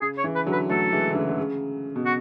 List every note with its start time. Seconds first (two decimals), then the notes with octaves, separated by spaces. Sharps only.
0.01 C#3 G#4
0.18 C#5
0.24 C#3 E3
0.35 B4
0.46 D3 F#3
0.52 B4
0.69 F#3 A3 A4
0.92 E3 G#3
1.10 D3
1.15 C#3 E3
1.29 D3
1.37 C#3
1.96 B2
2.06 F#4